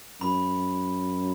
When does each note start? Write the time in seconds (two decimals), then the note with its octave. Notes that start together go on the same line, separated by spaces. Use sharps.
0.21 F#2 B5